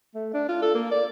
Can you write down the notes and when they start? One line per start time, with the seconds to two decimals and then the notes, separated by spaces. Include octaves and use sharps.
0.15 A3
0.34 D4
0.49 F4
0.62 A4
0.75 A#3
0.92 D5